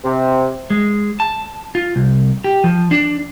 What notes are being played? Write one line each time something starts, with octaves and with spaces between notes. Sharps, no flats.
C3
G#3
A5
F4
C2
G4
F3
D4